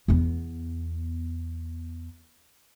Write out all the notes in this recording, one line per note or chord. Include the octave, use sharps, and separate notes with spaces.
E2 B3